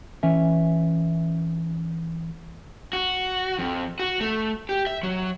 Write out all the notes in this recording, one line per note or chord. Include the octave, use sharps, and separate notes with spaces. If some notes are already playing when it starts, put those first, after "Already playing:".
E3 C#4 E5
F#4
F2
F#4
A3
G4
E5
F#3